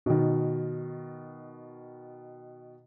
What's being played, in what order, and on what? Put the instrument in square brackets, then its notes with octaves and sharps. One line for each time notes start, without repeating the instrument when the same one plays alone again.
[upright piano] B2 D#3